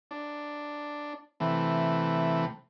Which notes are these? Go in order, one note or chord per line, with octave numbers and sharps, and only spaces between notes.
D4
C3 E3 A3